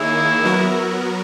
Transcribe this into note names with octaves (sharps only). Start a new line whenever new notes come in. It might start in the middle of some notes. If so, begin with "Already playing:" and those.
Already playing: D#3 A#3 D#4 E4 G#4 C#5
F#3 B3 F#4 A#4